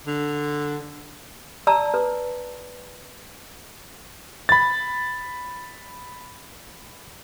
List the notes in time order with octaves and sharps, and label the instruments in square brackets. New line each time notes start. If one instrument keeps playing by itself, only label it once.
[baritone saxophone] D3
[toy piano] D5 A5 A#5 E6
B4
[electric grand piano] B5 A6